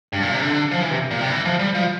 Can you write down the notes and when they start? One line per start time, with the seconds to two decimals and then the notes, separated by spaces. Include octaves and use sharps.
0.13 G2
0.22 A#2
0.32 C3
0.42 D3
0.71 F3
0.82 E3
0.91 C3
1.11 A#2
1.21 C3
1.30 E3
1.45 F3
1.59 G3
1.75 F3